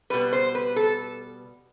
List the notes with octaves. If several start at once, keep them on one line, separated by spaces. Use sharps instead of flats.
B2 G3 B4
C5
B4
A4